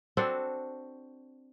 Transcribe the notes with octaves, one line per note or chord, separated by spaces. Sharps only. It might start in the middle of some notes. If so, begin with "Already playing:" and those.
C4 D4 F#4 A4